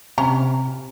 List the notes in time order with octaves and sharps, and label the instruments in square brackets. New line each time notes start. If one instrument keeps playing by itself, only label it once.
[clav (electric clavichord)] C3 [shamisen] C#4 A#5